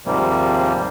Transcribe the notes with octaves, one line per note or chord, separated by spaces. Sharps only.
D#2 G#2 C3 F3 G3 A#3